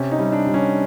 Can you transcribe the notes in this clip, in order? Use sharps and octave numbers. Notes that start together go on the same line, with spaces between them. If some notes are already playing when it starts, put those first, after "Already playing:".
Already playing: C3 C#4
D#4
G3
D4
G3
C#4